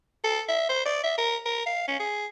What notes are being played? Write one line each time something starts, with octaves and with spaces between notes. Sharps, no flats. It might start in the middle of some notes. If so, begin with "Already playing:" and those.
A4
E5
C5
D5
E5
A#4
A#4
F5
C#4
G#4